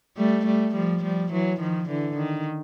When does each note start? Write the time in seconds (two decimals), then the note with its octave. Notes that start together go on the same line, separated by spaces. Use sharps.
0.17 G3 A3
0.46 G3 A3
0.74 F3 G3
1.03 F3 G3
1.32 E3 F#3
1.60 D#3 F3
1.89 D3 E3
2.18 D#3